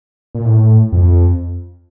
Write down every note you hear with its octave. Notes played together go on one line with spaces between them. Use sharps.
A#2
A2
F2